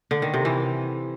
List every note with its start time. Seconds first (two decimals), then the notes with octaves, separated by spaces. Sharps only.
0.11 D3
0.22 D#3
0.34 C3
0.45 E3